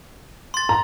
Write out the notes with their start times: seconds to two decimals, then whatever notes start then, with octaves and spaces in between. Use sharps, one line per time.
0.54 C6 A6
0.69 A#5